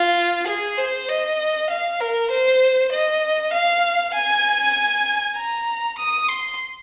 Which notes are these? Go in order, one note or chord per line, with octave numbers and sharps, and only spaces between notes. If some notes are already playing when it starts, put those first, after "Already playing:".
Already playing: F4
G#4
C5
D#5
F5
A#4
C5
D#5
F5
G#5
A#5
D#6
C6